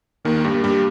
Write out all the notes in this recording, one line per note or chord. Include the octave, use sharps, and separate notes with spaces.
D#2 D#3 A#3
G2 G3
A#3
G2 G3